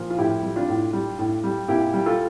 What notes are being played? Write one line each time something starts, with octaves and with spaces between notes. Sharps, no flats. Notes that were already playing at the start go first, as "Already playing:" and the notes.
Already playing: A#2 F3
F4
A2 E4 G4
G3
D4 F4
A2
G3
A2
G3
A#2 E4 G4
G3
F4 A4